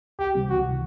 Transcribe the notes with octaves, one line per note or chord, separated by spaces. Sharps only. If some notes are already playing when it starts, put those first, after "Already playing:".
C#2 G4
C3 E3 G3 C4
C#2 F#4
C3 E3